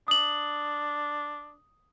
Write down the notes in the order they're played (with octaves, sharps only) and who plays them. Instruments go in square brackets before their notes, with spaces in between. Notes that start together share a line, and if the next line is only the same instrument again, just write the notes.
[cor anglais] D4 [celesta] D#6 F#7